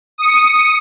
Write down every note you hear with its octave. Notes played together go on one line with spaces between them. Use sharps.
D#6 C#7